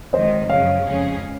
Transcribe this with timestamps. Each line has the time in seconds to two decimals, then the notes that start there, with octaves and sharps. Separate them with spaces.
0.13 F2 D#3 G#3 C5 D#5
0.50 F#2 C#3 F3 C#5 F5
0.86 F2 C#3 G#3 C#4 G#4